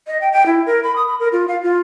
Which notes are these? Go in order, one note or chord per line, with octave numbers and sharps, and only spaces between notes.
D#5
G5
G5
E4
A#4
B5
D#6
B5
A#4
F4
F5
F4